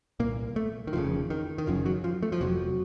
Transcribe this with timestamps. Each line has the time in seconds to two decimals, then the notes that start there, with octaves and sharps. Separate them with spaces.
0.20 C2 A#2 A#3
0.56 A3
0.87 D#3
0.93 F1 F2 C#3 F3
1.30 D#3
1.58 D#3
1.67 F#1 F#2 C#3 F3
1.86 F#3
2.04 F3
2.23 A3
2.32 F3
2.41 F1 F2 C3 F#3